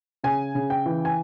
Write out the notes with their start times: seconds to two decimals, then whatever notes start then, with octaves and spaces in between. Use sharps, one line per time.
0.24 C#3 G#5
0.55 C#3
0.70 G5
0.86 E3
1.05 G#5